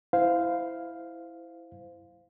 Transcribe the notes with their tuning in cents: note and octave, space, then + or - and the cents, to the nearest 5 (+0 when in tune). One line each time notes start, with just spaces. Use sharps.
E4 +0 C5 -20 F5 +0